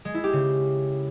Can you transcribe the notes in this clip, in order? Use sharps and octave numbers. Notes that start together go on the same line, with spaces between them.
G#3
E4
G4
C#3